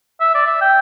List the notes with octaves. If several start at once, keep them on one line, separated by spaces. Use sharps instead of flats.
E5
D5
E5
G5